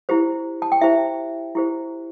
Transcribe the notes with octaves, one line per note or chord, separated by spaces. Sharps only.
E4 G4 C5
A5
G5
E4 G4 C5 E5
E4 G4 C5